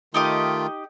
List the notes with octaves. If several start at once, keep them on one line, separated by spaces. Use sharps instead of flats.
D#3 A3 D#4 F4 G4 D#5